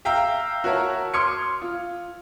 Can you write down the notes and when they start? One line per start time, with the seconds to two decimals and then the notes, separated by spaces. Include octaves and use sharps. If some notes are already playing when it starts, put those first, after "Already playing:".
0.05 E5 F5 G5 A#5 E6
0.64 F#4 A#4 C#5 E5 A5 A#5
1.14 C6 D6 D#6 F6 G#6 C#7
1.62 F4